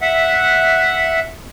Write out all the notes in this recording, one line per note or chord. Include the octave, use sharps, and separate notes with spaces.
E5 F#5